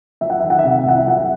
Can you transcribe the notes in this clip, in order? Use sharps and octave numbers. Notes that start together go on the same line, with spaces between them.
F#3 E5
F#5
D#3 E5
F#5
E5
C3
F#5
E5
C2 F#5
E5
F#3 F#5
E5